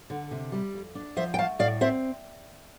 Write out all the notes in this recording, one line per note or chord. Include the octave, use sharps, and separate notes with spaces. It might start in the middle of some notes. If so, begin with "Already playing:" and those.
D3
C3
G3
F2
D4
F3 C5 E5
G5
A3 F5 A5
A2 D5 F5
C4 C5 E5